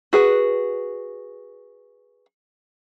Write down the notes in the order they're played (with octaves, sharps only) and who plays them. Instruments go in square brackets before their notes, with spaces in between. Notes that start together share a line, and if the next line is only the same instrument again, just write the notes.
[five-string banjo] F#4 G#4 B4